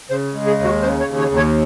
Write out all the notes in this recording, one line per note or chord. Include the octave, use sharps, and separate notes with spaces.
C#3 C5
G#3
G#4
D#2
F#4
C#3 C5
C#5
D#2
C#5
D#2
C#5